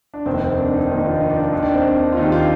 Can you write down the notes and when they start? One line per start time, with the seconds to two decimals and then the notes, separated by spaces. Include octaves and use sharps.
0.14 D4
0.25 F1 D#2 D#3 C4
0.42 C4
0.57 D4
0.74 D#4
0.89 F1 D#2 D#3 D#4
1.05 F4
1.21 D#4
1.30 D4
1.36 D#4
1.52 D#2 D#3 D#4
1.63 D4
1.73 C4
1.82 D4
2.12 F4
2.17 D#2 D#3 D#4
2.25 G4
2.32 F4